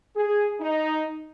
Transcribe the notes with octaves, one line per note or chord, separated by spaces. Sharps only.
G#4
D#4